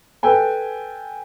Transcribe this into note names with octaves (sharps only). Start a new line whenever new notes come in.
A4 B4 G5 G#5